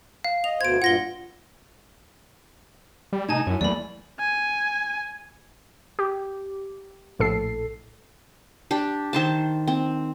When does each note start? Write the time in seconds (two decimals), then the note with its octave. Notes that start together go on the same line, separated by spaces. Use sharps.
0.24 F5
0.44 D#5 F7
0.61 D2 B2 C5 G#6 D7
0.82 G2 A#2 F4 F#5 A#6 G7
3.13 G3
3.29 A2 C3 D#4 G#5 A5 G#6
3.47 F#2 E4 C#5
3.61 E2 F#3 A3 A#3 D5 B5
4.20 G#5
5.99 G4
7.19 A#1 A2 A4 C7
8.71 D4 G4
9.13 D#3 C5 A5
9.67 C4